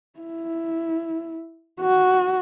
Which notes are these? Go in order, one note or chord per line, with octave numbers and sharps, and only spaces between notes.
E4
F#4